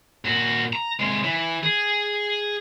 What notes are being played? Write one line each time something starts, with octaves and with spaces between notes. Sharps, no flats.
A#2 F#4
A#5
C3 G#3
E3
G#4